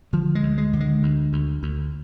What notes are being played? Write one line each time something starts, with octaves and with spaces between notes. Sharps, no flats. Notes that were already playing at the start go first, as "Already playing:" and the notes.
D3 F3
G#3
D2
G#3
D3
G#3
D2
D2
D2